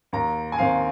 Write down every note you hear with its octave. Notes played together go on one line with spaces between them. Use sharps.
D#2 A#5
G#5
D#3 C4 F5